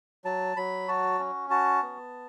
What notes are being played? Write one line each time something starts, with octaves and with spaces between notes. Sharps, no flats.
F#3 A5
F#3 B5
F#4 A5
C#4
F#4 A5
B3